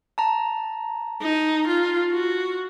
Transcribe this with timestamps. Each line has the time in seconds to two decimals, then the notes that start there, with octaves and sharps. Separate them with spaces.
0.18 A5 A#5
1.22 D#4
1.67 F4
2.11 F#4